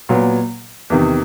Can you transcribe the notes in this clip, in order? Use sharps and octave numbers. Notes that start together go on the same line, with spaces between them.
A#2 F#3 B3
E2 C3 D#3